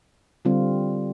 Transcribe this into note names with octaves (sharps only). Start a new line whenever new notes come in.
D3 G3 C4 F4